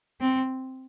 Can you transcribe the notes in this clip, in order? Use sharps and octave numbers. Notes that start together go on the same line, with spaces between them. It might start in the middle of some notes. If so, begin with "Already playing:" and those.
C4